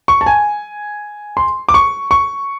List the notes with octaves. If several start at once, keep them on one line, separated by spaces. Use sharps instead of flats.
C#6
A5
G#5
C6
D6
C#6
C#6